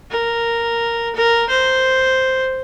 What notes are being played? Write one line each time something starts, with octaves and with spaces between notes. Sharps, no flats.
A#4
A#4
C5